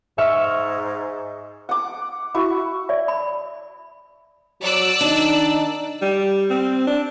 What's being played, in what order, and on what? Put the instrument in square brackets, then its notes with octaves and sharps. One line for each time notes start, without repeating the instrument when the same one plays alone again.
[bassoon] G#2 [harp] E5 C#6 F6
[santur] F#5 D6
E4 F#4 C#6
[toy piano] D5 E5
B5
[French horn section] F#3 [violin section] D5 E6 F#6
[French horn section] D#3 D#4 [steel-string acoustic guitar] D4
[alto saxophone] G3
C4
D4